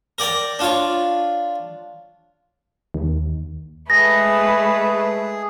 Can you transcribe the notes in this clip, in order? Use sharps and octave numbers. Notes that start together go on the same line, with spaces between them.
A#4 D5 G5 A#5
D4 F4 C#5
D#2
G#3 A3 G#4 B4 A#6